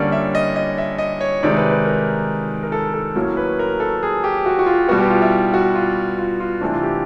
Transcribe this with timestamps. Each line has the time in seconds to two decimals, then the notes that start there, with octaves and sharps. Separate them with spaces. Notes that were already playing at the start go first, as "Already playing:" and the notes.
Already playing: D3 G3 A#3 C#4 C#5 D5
0.12 E5
0.35 D#5
0.56 D#5
0.78 E5
0.98 D#5
1.21 C#5
1.43 C3 D#3 G#3 D5
1.57 B4
1.71 B4
1.85 A#4
2.63 A#4
2.72 A4
2.94 A4
3.15 A2 F#3 A#3 C#4
3.37 B4
3.59 A#4
3.80 A4
4.03 G#4
4.24 G4
4.46 F#4
4.59 F#4
4.66 F4
4.88 B2 G3 B3 F#4
4.99 G4
5.10 F4
5.22 E4
5.54 F#4
5.75 F4
6.18 F4
6.40 F4
6.61 C3 E3 A3 D4 E4
6.72 F4
6.83 G4